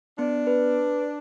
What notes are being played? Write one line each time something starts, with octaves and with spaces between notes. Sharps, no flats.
B3 D4
B4